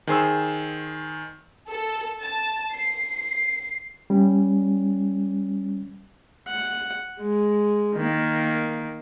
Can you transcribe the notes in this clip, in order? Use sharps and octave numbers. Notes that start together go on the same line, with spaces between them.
D#3 G#4 C5 E6
A4
A5
C7
G3 C#4
F#5
G#3
D#3 A#3